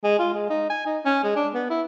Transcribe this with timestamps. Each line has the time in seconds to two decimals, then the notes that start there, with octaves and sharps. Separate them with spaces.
0.04 G#3
0.19 F4
0.34 G#3
0.50 D#4
0.70 G#5
0.86 D#4
1.05 C#4
1.24 G#3
1.36 D4
1.54 B3
1.70 E4